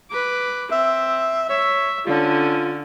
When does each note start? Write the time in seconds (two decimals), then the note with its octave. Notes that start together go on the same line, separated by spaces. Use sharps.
0.11 B4 D6
0.71 C4 E5
1.49 C#5 E5
2.06 D3 C#4 F4